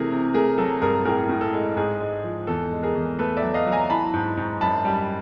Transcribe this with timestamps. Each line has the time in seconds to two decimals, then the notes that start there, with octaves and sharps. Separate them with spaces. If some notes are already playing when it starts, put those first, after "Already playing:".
Already playing: C3 E3 A3 G#4 A#4
0.11 C3
0.34 A3 G#4 A#4
0.58 F#3 A4
0.82 G2 G#4 A#4
1.05 A2 G#4 A#4
1.29 A2
1.41 A4
1.53 G#3
1.76 G#2 G#4
2.00 G#3
2.24 F3
2.47 E2 A4
2.72 G#3
2.83 G#4 A#4
2.95 E2
3.19 A3 A4 B4
3.37 D5 E5
3.42 F#3
3.54 D#5 F5
3.66 F#3
3.72 G#5 A#5
3.90 E3 A5 B5
4.14 G#2
4.37 G#2
4.61 F#2 A5 B5
4.85 G3